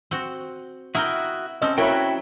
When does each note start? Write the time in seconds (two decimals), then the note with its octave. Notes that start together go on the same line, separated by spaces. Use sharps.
0.11 C4 F#4
0.95 E4 F#4 A#4 E5 G5 D#6
1.62 C4 C#4 A4 D#5
1.78 F#3 E4 A#4 C#5 G5 B5